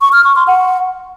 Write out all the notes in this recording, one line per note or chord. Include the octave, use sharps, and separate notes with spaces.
C#6
F6
C#6
C6
F#5